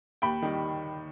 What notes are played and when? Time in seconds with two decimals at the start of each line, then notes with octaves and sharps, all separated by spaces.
0.22 D#2 G5 B5
0.42 D#3 G3